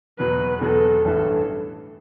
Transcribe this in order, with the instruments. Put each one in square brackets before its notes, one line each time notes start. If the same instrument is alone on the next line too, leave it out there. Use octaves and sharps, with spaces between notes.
[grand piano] E2 B2 F#3 [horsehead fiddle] B4
[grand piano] E2 B2 F#3 [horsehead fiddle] A4
[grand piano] A1 G2 E3 A3 E4 [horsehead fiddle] A4